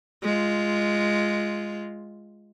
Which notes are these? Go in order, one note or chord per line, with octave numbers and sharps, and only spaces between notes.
G#3 F4